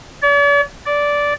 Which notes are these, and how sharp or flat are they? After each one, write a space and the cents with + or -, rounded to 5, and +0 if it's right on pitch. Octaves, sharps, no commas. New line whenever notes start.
D5 -45
D5 -10